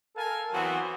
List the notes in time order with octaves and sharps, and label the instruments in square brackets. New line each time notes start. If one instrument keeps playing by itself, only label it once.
[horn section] A4 A#4 F5 G#5 A5
E3 F#3 B3 C4 F#4